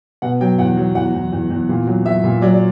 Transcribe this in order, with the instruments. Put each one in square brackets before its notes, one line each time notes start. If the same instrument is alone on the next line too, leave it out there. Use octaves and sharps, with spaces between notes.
[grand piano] B2 F#5
F#3 G5
E2 F#5
F#3
E2 F#5
E2
E2
E2
A#2
F#3
F#3 E5
A#2
F#3 D5
D5